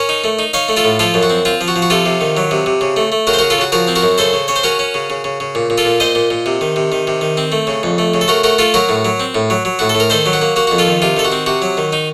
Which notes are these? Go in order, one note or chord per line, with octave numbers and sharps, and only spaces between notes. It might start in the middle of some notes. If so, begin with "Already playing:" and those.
Already playing: C#4 A#4 C#5
D#4
A3
D#4
D#4 C#5 F5
A3
F4 A4
A2
F3 F4 A4
F#2
F#4
C4
C4 F4
F3
F#4
F3
F#4
C3 F4 A4
C3
D#3
F#3
C3
C3
C#3
A3
A3
C#3 F#4 A#4
C5
C#3 F#4 A#4
F4 A4
C#3 F#4
F3 F#4 A#4
C4
F#4 A#4
F#2
C#3 A4 C5
C#3
C#3 C#5
C5
C#4 F#4 A#4
C#4
C#3
C#3
C#3
C#3
A#2
A#2
F4 A4
A#2
A#2 C5 D#5
A#2
A#2
C3
D#3
C3
D#3
C3
D#3
C4
A3
C#3
F2
A3
C#3
A4
A3 F#4 A#4
A3 F#4 A#4
A3 F4 A4
F#3 F#4 A#4
A2
F#3
C4
A2
F#3
F#3
A2 F#4
A4
A2
A#4
D#3 A4 C5
F#3
F#4
A#3
A#3 F#4
F2 F#4
F4 A4
D#3
C3 F4
D#3 A4
F#4
C4
C3 F#4
F#3
D#3
D#4